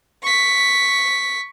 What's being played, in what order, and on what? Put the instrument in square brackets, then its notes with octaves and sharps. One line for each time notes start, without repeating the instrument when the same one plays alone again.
[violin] C#6 B6